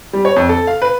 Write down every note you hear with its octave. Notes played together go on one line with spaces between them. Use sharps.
G3
C#5
F2
A4
F5
B4